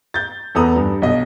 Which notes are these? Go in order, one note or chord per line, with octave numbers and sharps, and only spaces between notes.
G6 A6
E2 A4 B4 A#5 D#6
G2
B1 D#5